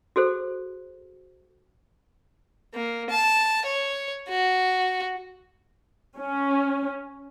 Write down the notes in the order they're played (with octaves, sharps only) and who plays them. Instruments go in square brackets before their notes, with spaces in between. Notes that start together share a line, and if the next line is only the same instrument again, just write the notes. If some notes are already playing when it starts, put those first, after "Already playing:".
[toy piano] F#4 G#4 A4 C5
[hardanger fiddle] A#3
A5
C#5
F#4
[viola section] C#4